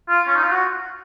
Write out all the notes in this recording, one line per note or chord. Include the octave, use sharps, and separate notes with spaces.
F4
C#4
D#4
F4
F#4